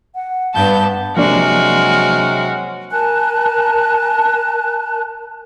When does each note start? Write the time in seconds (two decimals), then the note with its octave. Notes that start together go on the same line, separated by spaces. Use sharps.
0.15 F#5
0.54 G2 B3 A5 G6
1.17 C3 F3 F#3 G#3 A#3 D4 F#4 F6
2.91 A#4 G#5 A5 F#6